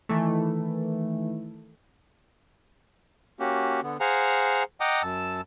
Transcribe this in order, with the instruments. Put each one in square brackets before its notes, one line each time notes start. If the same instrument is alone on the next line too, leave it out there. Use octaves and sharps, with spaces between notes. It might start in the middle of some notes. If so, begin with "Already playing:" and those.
[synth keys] D#3 E3 A3
[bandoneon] A#3 C#4 F#4 G4
D3 B3
G#4 C5 F5 F#5 G#5 A#5
D#5 F#5 G5 A#5 D6 D#6
F#2 A5 E6